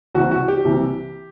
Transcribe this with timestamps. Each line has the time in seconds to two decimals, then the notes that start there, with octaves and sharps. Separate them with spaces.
0.14 C2 C3 E3 F#4
0.31 F#4
0.48 G4
0.65 C2 C3 E3